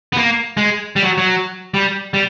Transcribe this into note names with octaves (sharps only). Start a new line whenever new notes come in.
B3
A#3
G#3
G3
F#3
F#3
G3
G3